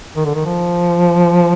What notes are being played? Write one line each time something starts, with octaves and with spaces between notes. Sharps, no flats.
D#3
D3
D#3
F3